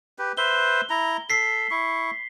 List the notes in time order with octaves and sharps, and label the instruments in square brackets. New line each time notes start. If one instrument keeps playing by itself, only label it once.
[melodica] G4 B4
[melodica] B4 C5 E5 [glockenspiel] G7
[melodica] E4 A#5
[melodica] A4 [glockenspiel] B6 C7
[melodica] E4 C#6